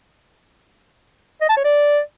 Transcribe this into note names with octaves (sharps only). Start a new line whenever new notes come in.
D#5
A5
C#5
D5